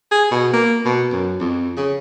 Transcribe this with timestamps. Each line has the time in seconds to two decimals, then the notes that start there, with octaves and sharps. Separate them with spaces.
0.11 G#4
0.31 B2
0.53 A#3
0.85 B2
1.12 F#2
1.40 F2
1.77 C#3